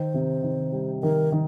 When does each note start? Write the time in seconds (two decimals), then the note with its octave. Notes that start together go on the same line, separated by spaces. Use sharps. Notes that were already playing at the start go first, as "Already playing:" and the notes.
Already playing: D#3 C5
0.14 C3
0.43 D#3
0.72 G3
1.03 D#3 A#4
1.32 D#3